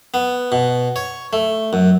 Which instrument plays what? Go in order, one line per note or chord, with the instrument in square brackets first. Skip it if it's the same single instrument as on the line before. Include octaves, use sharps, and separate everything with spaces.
[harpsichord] B3
B2
C#5
A3
F#2